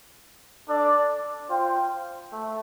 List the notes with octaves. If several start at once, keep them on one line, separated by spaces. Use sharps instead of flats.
D4 A4 D5
F4 C5 G5
A3